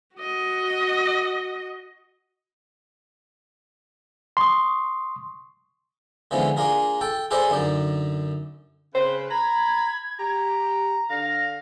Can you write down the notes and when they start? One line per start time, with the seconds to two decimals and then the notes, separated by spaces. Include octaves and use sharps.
0.16 F#4 D#5
4.37 C6 C#6 D#6
6.31 D3 E3 F3 G#3 B3 C#4
6.57 A#3 D4 F4 G#4 A#4
7.01 A4 G5 A5
7.31 G#4 A4 B4 C5 D5 D#5
7.50 F#2 D3 D#4 D5
8.95 C#3 B4 C5
9.30 A#5 B5 G#6
10.19 G4 A#5
11.10 D3 F5 A#6